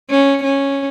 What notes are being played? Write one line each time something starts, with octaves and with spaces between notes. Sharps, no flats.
C#4
C#4